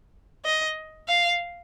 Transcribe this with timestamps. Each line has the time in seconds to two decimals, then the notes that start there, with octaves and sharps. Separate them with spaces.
0.45 D#5
1.08 F5